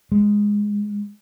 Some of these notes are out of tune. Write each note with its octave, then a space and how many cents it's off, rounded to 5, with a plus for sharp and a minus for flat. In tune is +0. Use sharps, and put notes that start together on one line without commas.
G#3 -10